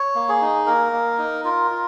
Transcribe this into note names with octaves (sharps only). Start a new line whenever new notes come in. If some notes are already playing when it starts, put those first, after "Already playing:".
Already playing: C#5
A#3
G#4
D#4
A#3 A#4
A#3
D#4
F4 A#4
F4